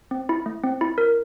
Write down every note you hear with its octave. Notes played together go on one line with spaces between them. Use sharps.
C4
E4
A3
C4
E4
A#4